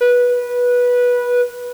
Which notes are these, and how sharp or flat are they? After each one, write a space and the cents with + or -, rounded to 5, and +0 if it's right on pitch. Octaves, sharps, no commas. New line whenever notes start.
B4 -15